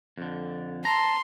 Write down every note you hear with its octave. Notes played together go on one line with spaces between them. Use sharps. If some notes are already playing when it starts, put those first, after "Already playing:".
F2 D3
A5 A#5 C6